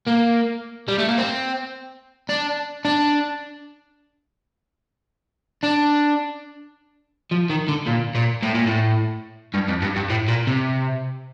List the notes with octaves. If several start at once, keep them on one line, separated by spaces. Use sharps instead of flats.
A#3
G3
A3
A#3
C4
D4
D4
D4
F3
D#3
D3
A#2
A#2
A2
A#2
A2
G2
F2
G2
G2
A2
A#2
C3